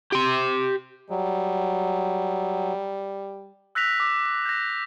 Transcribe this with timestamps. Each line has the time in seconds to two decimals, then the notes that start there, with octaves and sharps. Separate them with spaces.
0.13 G4 C6
1.10 F#3 G3
3.75 E6 F#6 A#6 B6 F7
4.00 D6
4.46 G6 A#6